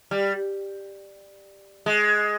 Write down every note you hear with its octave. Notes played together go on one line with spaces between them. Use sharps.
G3
G#3